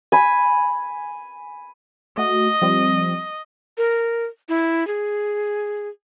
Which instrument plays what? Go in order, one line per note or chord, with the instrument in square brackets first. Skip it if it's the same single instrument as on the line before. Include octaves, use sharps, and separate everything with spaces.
[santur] G#5 B5
[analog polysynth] A3 F#4 [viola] D#5
[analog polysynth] F3 G3 C4
[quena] A#4
E4
G#4